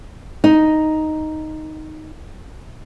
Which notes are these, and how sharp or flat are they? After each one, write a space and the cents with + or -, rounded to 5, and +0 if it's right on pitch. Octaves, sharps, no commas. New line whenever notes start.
D#4 +0